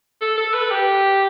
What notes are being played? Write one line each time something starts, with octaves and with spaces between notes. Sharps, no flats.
A4
A4
B4
G4